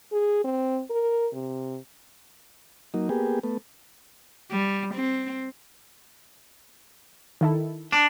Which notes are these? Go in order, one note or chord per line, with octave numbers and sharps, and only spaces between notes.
G#4
C4
A#4
C3
F#3 A#3 D#4
A#3 B3 G4 G#4
A3 B3
G3
C4
D#3 E4 A4
D4